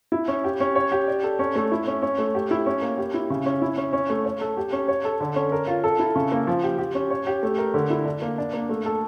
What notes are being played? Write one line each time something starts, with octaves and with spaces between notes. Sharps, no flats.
E4
C#4
G4
C#4
C#5
G4
D5
A4
C#4
A3
E4
C#4
C#4
A3
G4
E4
C#4
A#3
G4
E4
C#3
C#4
E4
C#4
C#4
A3
C#5
A4
G4
C#4
C#5
A4
D3
C#4
A#4
F4
A4
E4
C#3
A#3
F3
G4
G4
C#4
C#5
G4
A3
A#4
D3
E4
D4
A#3
D4
A#3
A3
A4